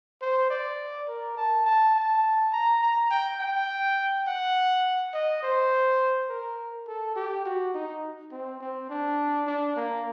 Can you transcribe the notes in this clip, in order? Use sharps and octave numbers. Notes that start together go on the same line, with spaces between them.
C5
D5
A#4
A5
A5
A5
A#5
A#5
G5
G5
F#5
D#5
C5
A#4
A4
G4
F#4
D#4
C4
C4
D4
D4
A#3